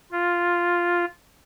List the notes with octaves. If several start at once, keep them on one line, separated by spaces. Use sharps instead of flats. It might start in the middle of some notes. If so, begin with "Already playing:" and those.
F4